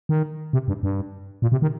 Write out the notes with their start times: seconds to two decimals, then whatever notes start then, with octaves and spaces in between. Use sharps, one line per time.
0.09 D#3
0.53 C3
0.68 G2
0.83 G2
1.42 A#2
1.52 C3
1.62 D#3